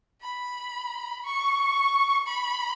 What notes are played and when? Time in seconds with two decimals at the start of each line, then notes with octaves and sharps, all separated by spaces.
0.22 B5
1.25 C#6
2.28 B5